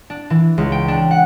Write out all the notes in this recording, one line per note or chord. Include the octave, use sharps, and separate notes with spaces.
D4
E3
C#2
G5
D4
F#5